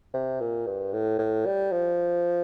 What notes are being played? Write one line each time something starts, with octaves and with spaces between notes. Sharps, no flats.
C3
A#2
G2
A2
A2
G3
F3